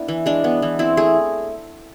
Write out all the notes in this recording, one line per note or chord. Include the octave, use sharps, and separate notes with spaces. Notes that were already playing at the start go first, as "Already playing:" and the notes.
Already playing: B3 D4 E4
E3
G#3 D4
B3
E3
C4 E4
A3 G#4